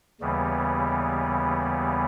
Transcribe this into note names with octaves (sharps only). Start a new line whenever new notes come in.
D#2 C#3 E3 G3 B3